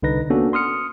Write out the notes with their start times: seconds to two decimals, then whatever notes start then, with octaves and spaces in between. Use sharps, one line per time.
0.03 C2 D3 D#4 B4 A#6
0.30 A#3 B3 C#4 D4 F#4 A4
0.53 C6 D#6 F6 C#7